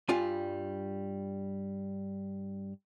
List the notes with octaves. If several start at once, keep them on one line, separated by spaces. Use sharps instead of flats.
G2 G3 F4 G#5